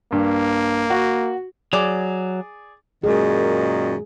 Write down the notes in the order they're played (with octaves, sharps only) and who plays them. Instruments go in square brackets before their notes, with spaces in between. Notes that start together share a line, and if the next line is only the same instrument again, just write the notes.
[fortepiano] G2 [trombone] A#3
[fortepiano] F#4
[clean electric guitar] F#3 [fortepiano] G#4 D5 D6
[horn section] F#2 A#2 D#3 [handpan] G#3 G#4